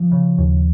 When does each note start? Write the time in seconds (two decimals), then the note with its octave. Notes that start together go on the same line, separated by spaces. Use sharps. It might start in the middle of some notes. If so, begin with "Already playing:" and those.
Already playing: F3
0.12 C#3
0.38 D#2